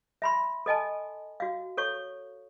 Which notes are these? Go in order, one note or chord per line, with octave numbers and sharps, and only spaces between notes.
E5 B5 C6
A4 D#5 G#5 A5
F#4 F5
A4 C#5 C#6